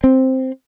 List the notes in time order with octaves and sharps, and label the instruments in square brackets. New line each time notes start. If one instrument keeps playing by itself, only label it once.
[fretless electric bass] C4